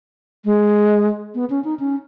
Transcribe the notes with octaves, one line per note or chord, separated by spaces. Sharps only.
G#3
B3
C#4
D#4
C#4